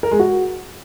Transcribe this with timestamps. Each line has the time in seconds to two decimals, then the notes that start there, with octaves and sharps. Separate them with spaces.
0.03 A#4
0.11 G#3
0.20 F#4